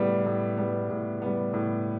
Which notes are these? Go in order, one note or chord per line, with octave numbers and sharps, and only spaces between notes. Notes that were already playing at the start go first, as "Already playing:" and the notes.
Already playing: A2 G3 B3
A2
G3 B3
A2
G3 B3
A2